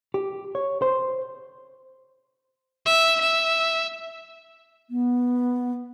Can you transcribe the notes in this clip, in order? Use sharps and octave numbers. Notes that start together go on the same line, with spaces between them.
G4
C#5
C5
E5
E5
B3